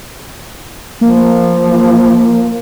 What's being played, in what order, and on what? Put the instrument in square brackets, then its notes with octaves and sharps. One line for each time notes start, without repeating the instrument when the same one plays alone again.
[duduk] F3 [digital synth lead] A#3